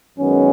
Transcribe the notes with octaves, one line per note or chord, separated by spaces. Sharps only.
F#2 D#3 G#3 B3 C#4